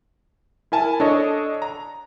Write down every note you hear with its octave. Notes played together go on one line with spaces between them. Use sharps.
E4 A#4 G#5 A5
D4 A4 C#5 D#5
A#5